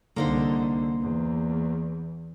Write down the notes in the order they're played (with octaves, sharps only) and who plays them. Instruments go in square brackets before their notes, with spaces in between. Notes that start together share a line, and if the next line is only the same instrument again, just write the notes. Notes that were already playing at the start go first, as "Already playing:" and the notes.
[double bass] C2 D3 [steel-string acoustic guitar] A#3 D#4 C5
[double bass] E2